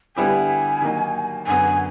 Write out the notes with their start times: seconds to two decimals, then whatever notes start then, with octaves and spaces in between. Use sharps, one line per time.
0.17 D3 G3 B3 E4 G4 G#5
0.82 D#3 F#3 A#3 D#4
1.47 F#2 D3 F#3 B3 G#5